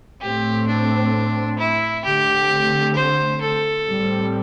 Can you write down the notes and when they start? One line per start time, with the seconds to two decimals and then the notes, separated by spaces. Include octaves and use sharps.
0.21 A2 A3 C4 G4
0.67 D4
1.59 E4
2.04 D3 A3 C4 G4
2.95 C5
3.41 A4
3.86 A2 G3 C4